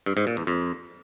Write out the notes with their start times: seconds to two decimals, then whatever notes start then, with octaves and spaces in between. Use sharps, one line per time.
0.06 G2
0.17 G#2
0.27 A#2
0.37 E2
0.47 F2